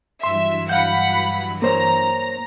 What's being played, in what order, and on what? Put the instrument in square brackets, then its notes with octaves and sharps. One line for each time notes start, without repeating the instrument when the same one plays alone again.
[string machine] G2 E3 F#3 [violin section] E5 [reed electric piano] C6
[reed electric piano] F5 G6 [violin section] F#5 B5
[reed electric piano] A#3 C5 C#5 [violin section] A#5